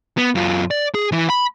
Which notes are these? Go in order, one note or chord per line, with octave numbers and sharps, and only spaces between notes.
B3
F#2 F4
D5
G#4
E3 E4
B5